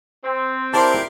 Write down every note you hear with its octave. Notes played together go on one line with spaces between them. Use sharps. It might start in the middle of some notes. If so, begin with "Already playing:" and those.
C4
E4 G4 A#4 C5 D5 A5 C6